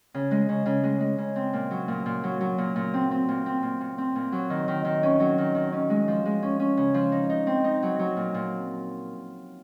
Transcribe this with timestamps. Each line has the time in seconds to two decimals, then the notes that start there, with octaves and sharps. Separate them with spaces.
0.14 C#3
0.31 G#3
0.49 C#3
0.66 C#3
0.84 G#3
1.00 G#3
1.18 C#3
1.35 C4
1.53 A#2
1.71 F#3
1.88 A#2
2.06 A#2
2.24 F#3
2.41 F#3
2.58 A#2
2.76 A#2
2.94 C4
3.11 C4
3.28 A#2
3.46 C4
3.63 A#2
3.81 A#2
3.98 C4
4.15 A#2
4.32 F#3
4.50 D#3
4.68 D#3
4.85 D#3
5.03 C#4
5.20 F#3
5.38 D#3
5.55 D#3
5.72 C#4
5.90 G#3
6.08 F3
6.25 G#3
6.43 C#4
6.60 C#4
6.77 C#3
6.94 F3
7.12 D#4
7.30 D#4
7.47 C4
7.64 D#4
7.83 F#3
7.99 F#3
8.17 A#2
8.34 A#2